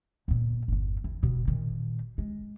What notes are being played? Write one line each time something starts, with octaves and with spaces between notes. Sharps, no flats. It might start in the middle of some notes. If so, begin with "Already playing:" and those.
G1 A#2
G1 E2
E3
E1 B2
A#2 D#3
G#3